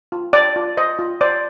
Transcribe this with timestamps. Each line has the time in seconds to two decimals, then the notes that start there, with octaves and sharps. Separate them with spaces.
0.12 F4
0.33 C5 D5
0.56 F4
0.77 C5 D#5
0.99 F4
1.21 C5 D5